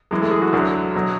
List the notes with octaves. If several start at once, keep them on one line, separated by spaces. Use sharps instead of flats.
F#2 E3 G#3
A3
G#4
F#4
D2 D3 F#3
B2 F#3